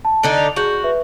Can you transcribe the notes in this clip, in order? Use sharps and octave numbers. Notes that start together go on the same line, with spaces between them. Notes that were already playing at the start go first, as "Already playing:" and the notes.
A5
D3 D4 D#4 F#7
F7
F#4 G#4 G6 F#7
B4 E5